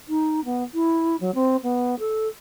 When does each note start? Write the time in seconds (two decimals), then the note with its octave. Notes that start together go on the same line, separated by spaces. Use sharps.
0.09 D#4
0.45 B3
0.74 E4
1.21 F#3
1.35 C4
1.63 B3
1.99 A4